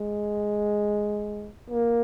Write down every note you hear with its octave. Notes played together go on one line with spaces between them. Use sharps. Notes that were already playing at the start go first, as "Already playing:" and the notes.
Already playing: G#3
A#3